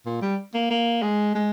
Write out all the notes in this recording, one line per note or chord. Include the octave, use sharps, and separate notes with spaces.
A#2
G3
A#3
A#3
G#3
G#3